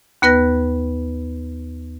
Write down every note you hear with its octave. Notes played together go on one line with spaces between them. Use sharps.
D#2 B3 B4 F#6 A#6